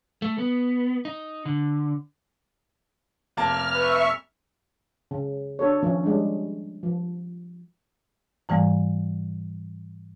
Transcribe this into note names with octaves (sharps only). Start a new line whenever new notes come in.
A3
B3
D#4
D3
F1 A#3 A5 F6
B4 E5 C#6
C#3
D4 F#4 A4 C#5
D#3 F3 A#3 C#4
G3 G#3 C#4 D4
F3
G#2 E3 G3 A#3